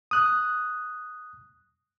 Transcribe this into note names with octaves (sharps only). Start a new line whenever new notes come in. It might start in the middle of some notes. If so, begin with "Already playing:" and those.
D#6 F#6